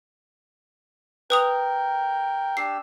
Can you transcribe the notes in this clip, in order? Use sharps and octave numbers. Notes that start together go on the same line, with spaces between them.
A#4 B4 G5 D#6 F7
D4 G4 E6 C7